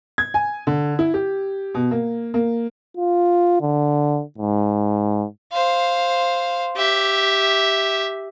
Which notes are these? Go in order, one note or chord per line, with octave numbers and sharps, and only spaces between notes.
G#6
G#5
D3
E4
G4
B2
A#3
A#3
F4
D3
G#2
C5 F5
G4 E5